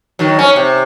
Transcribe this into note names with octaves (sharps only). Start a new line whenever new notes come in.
D#3 F#3
C#4
C3